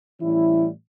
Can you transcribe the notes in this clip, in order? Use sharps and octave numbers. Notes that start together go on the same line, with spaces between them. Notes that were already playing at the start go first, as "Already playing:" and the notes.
A2 E3 G3 C#4 E4